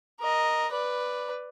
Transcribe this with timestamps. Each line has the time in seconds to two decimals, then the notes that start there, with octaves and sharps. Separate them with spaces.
0.20 A#4 D#5
0.72 B4 D5